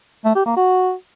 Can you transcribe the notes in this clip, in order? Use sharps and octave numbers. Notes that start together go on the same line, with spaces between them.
A3
G4
A#3
F#4